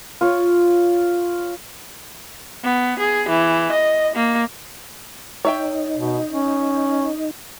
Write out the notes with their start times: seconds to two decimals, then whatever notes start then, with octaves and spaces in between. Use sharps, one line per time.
0.21 F4 C#5
2.64 B3
2.99 G#4
3.29 E3
3.72 D#5
4.15 A#3
5.45 D#4 C#5 E5 G5
5.98 B2
6.31 C#4